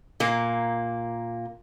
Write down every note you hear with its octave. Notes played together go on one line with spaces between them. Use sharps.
A#2 A#3